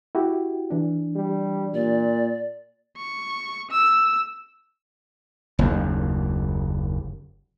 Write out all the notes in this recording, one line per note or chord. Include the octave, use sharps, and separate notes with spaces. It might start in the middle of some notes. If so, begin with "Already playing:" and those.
E4 F#4 G4
E3 D4
G3
A#2 D5
C#6
E6
F#1 D#2